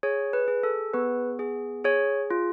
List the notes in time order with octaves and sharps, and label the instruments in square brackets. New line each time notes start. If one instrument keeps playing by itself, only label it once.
[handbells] G#4 C#5
B4
G#4
A4
B3 B4
G#4
G#4 C#5
F4